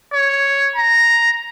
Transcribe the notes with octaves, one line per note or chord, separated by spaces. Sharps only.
C#5
A#5